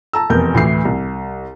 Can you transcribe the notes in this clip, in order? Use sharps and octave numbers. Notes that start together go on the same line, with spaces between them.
A5 A#5 E6
F1 E2 A#4 G6
D2 A2 E3 C7
C2